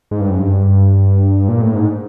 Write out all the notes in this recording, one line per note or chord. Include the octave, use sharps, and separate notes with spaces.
G#2
G2
F#2
G2
A#2
A2
G#2